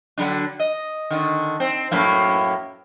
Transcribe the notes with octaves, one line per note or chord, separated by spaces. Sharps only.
D3 F#3 D4
D#5
D3 D#3
C4
F#2 A2 A#3